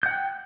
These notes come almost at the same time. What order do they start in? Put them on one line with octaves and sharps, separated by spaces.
G6 F#5 F#6 G5